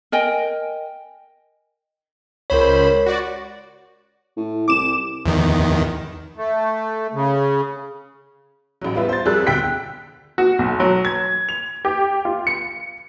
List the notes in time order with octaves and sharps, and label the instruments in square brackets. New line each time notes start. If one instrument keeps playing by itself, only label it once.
[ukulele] A#4 D#5 G5 G#5
[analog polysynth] C#2 C5 B5 [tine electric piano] A#4 C#5
[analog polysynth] F#4 D5
[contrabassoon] A2
[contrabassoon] C2 [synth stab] D6 E7
[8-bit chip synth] E2 D#3
[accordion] A3
C#3
[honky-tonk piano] A1 F#3
G3 B3 F4 B4 E5
C5 A6
F2 G3 G#4 A#4 E6 F#6
D2 B2 G5 F#6 B6
F#4
B1
F#3
G#6
F7
G4
F4
C#7